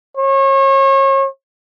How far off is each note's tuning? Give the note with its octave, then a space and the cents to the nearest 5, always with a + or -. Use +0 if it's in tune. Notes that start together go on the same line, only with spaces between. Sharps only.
C#5 -35